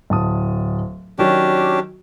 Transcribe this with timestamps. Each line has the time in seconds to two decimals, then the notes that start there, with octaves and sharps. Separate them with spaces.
0.10 D1 A5 D#6
1.19 D#3 F#3 C#4 D4 F#4 G4